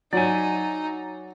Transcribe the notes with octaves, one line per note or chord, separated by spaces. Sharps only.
F#3 D#4 D5 G#5